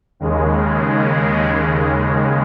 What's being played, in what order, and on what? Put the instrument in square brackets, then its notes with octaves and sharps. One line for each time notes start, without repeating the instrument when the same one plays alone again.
[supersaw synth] D#2 C#3 G#3